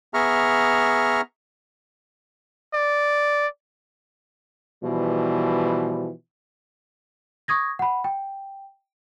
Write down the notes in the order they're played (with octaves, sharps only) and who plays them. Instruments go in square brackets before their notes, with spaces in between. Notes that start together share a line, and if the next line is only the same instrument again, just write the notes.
[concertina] B3 G#4 E5 A#5 C#6 F6
[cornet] D5
[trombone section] B2 E3 F3 G3
[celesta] C#6 D#6 G#6 A#6
F#5 B5
G5